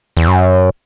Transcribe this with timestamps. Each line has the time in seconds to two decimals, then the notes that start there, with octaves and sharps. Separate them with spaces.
0.17 E2
0.28 F#2